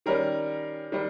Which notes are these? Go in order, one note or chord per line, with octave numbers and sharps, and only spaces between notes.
D#3 G3 C#4 A#4
D#3 G3